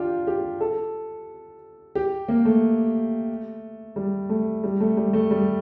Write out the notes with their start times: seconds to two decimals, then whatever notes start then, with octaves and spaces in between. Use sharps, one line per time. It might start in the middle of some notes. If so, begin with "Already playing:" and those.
Already playing: D4 F4 G4
0.27 G4
0.61 A4
1.95 G4
2.28 A#3
2.45 A3
3.96 G3
4.29 A3
4.64 G3
4.80 A3
4.97 G3
5.13 A3
5.31 G3